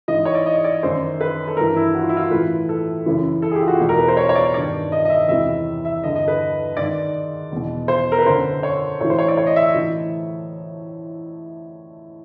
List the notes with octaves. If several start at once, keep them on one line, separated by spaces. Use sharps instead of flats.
G#2 E3 D#5
C#5
D5
D#5
D5
F#2 D#3 C5
B4
A4
G2 E3 A#4
E4
F#4
F4
E4
F4
A2 E3 B4
A4
F#2 C#3 E3
A4
G#4
G4
F4
F#4
E2 B2 G4
A#4
B4
C5
C#5
C#5
D5
G2 D#3 D5
D#5
D#5
E5
E2 C3 E3 E5
E5
G2 D3 D#5
D#5
B4
G#2 D#3 D5
E2 B2
C5
A#4
B4
F#2 D3 C5
C#5
A2 E3 C#5
C5
C#5
D5
C#5
D#5
E5
A2 E3